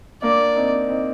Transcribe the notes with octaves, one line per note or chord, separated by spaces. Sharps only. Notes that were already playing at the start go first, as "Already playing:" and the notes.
A#3 D4 D5
C4 D#4
C4 D#4